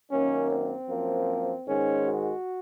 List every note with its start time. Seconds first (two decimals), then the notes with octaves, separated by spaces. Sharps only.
0.11 F#2 D#3 A#3 C#4
0.50 C4
0.89 F#2 F3 A#3
1.67 G#2 D#3 G#3 C#4
2.06 F#4